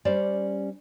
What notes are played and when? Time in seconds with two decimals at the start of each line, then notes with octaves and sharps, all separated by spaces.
0.05 G3 C#4 C5 D5